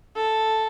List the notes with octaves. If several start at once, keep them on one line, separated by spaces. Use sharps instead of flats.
A4